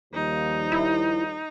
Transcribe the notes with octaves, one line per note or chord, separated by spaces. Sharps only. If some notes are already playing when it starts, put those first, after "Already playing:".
D#2 F3 G3 D#4
E4